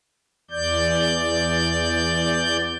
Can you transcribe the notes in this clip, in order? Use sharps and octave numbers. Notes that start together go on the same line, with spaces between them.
E2 D5 G6